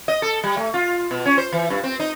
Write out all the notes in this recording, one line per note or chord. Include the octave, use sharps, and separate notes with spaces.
D#5
A4
G3
A3
F4
B2
C#4
C5
E3
G2
C4
D#4